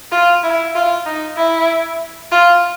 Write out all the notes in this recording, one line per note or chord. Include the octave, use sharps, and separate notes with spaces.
F4
E4
F4
D#4
E4
F4